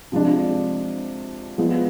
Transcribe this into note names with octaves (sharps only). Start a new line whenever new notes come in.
C3 F3 G#3 D4
F3 G#3 B3 F4